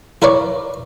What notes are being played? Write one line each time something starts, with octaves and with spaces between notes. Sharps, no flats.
E4 A#4 B4 C#5 D5